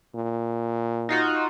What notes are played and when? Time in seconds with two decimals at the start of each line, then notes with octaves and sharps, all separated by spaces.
0.15 A#2
1.09 D#4 F4 F#4